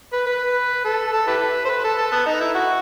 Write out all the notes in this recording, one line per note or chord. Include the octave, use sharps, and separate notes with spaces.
B4
B4
A4
A4
E4 G4 B4
C5
B4
A4
A4
B3
D#4
E4
F#4